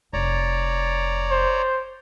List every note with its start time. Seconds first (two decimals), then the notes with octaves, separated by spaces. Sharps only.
0.13 F1 C#5 D5 A#5
1.31 C5